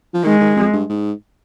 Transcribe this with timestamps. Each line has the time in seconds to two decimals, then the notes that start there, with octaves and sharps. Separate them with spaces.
0.14 F3
0.24 D#3 G#3
0.41 D#3
0.56 F2
0.73 G2
0.90 G#2